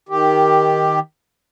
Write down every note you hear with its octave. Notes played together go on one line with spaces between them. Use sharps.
D#3 G4